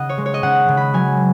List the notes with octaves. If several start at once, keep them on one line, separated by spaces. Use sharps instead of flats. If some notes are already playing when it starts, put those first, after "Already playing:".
Already playing: C#3 D#5 F#5
C#5
G#3
C#5
D#5
C#3 F#5
C#3
B5
F#3 G#5